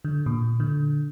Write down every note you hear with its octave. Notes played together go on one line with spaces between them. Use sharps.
D3
A#2
D3